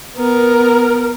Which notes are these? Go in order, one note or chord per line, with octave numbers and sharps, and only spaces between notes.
B3 A#4